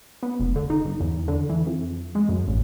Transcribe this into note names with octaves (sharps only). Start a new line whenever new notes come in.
B3
F1
D3
D#4
G1
E2
D3
E3
F2
G#3
F#2
A1